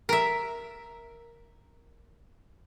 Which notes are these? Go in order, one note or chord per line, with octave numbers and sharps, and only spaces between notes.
A#4 E5